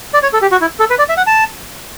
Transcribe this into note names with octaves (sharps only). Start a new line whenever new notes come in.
D5
C#5
A4
G4
F#4
E4
A4
B4
D5
E5
F#5
A5